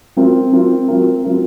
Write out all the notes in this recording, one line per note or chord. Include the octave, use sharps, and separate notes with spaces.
F#3 C4 F4 A#4
F#3 C4 F4 A#4
F#3 C4 F4 A#4
F#3 C4 F4 A#4